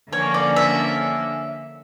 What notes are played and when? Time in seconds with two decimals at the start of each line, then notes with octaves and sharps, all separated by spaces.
0.13 D3 F3 A#3 C#4 C#5
0.34 D5
0.56 E5